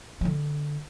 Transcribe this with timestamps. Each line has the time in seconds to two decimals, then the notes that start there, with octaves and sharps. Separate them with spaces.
0.21 F3
0.25 D3